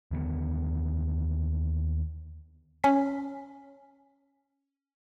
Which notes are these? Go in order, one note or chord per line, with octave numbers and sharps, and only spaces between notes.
D#2 D3 A3 B3
C#4 B6